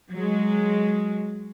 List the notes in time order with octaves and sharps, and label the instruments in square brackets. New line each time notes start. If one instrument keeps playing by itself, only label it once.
[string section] F#3 G#3